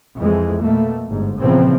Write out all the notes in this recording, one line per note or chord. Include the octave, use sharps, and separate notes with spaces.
F2 E3 G#3
B2 A3 A#3
G1 G#2
A#2 C#3 E3 F3 B3 C4